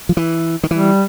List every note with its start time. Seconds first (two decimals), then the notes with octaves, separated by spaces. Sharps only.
0.09 F3
0.17 E3
0.63 D#3
0.71 E3 G3